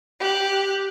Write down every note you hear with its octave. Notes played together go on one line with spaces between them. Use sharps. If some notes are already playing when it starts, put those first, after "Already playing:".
G4 F#6